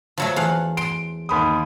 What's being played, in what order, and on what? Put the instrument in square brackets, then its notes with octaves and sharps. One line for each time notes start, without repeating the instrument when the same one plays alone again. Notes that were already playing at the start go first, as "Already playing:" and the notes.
[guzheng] F3 F#3 A3
E2 F5 F#5
[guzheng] C6 [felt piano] D7
[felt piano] D#2 B5 D#6